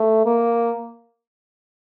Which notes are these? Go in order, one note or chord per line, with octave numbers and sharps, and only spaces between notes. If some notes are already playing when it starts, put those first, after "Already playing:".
Already playing: A3
A#3